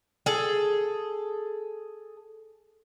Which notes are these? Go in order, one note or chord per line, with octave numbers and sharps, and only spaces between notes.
G#4 A4